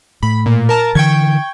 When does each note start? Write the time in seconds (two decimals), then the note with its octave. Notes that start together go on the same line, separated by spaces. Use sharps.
0.23 A2 B5
0.46 A#2
0.69 A#4 A5 A#5
0.95 D3 E3 G5 C#6 G#6